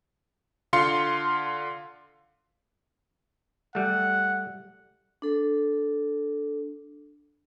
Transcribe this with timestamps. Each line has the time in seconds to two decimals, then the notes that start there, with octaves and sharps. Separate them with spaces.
0.73 D3 F4 F5 C6 C#7
3.75 G3 A3 F#5
5.22 D4 A4